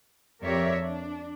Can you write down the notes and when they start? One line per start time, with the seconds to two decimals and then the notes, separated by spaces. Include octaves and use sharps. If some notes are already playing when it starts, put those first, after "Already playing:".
0.41 F2 G4 A#4 C#5 D5 E5
0.79 D4